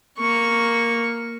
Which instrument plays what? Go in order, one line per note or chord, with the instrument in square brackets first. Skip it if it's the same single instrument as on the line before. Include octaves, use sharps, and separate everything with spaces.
[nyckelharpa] A#3 C#6